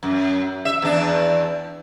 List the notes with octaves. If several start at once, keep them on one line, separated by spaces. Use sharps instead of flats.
F#2
E5
E2 D4